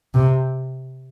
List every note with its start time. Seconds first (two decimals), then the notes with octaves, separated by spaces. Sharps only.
0.14 C3